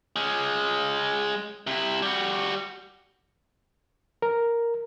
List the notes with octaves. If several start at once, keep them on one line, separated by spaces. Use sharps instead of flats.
G#3 C#4
C3 E4
G3 F#4
A#4